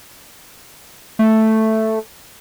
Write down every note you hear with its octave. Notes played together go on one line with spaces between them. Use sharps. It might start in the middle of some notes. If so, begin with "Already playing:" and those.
A3